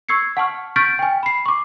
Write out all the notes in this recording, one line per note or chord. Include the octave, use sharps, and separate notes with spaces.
C#6 E6 G#6 C7 C#7
F#5 A5 C#6 F6
C#6 F6 G6 A6 B6 D7
G5 G#5
B5 C7
C#6 D6